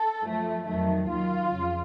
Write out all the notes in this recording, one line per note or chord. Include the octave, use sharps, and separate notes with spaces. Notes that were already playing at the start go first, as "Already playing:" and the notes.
Already playing: A4
F#2 F3 A3
F2 D#3 F#3 A3
D#2 D#3 F#3 F4
F2 C#3